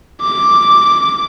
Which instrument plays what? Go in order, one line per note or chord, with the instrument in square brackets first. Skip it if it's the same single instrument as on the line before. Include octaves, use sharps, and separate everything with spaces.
[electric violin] D6